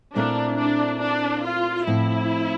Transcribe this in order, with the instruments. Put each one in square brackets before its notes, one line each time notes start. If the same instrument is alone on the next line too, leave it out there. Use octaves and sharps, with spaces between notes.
[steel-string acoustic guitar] A#2 A3 C4 E4 A#4 [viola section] D4
[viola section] D4
D4
F4
[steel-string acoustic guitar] A2 F3 C4 [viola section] E4